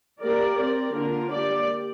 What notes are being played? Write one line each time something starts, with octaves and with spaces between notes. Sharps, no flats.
A#3 G4 A#4 D5
C4 A#4 D5
D3 A#3 F4 A#4
A#3 G4 D5